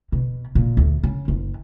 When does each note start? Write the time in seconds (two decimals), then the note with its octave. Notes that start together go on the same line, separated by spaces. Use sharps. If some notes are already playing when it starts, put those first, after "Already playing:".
0.12 B2
0.55 A#2
0.77 D2
1.03 C#3
1.28 F#1